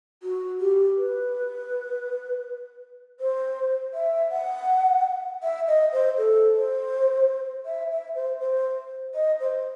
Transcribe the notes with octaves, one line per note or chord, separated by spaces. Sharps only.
F#4
G4
B4
C5
E5
F#5
E5
D#5
C5
A4
C5
E5
E5
C5
C5
D#5
C5